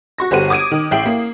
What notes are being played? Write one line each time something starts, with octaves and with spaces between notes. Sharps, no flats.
F#4 C#6 A#6
G1 F#4 G4 C5 F#5 D#7
D6 D#6 G#6 D7 D#7
D#3
A1 E5 G5 C7 F#7
A#3